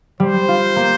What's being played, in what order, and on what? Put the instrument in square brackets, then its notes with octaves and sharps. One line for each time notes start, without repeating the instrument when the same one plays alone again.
[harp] G3 [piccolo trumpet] C5
[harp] F4
A#3